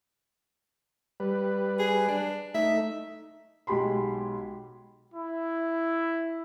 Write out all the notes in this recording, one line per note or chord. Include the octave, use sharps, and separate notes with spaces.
G3 B4
G#4
D4
A3 D#4 E5
B1 G#3 G4 B5 C6
E4